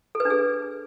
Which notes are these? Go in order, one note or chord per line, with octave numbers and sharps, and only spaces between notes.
A4
B4
D4
G#4